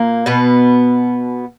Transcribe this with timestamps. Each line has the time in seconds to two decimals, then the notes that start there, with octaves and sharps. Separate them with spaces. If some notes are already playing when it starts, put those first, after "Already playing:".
Already playing: A#2 A#3
0.26 B2 B3